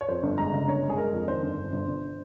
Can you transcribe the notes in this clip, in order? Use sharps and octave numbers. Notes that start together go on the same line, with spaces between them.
C#5
F2 C5
G1
G#3 A#5
C#3
G1 C#5
G#3
G#4
G#3 A#4
F2
D#3 C5
G1
G2
G1
G1